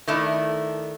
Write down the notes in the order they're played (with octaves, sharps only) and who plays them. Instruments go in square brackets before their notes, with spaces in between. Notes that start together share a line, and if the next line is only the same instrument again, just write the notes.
[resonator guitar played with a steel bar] D#3 A3 D4 E4